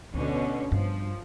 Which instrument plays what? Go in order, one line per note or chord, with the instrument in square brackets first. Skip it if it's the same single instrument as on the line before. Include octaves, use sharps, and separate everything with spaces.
[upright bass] D2 [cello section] B2 D3 C#4
[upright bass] G2 [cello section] F3